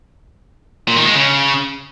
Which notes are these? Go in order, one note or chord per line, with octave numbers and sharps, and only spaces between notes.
A#2
D#3
G#3
C#3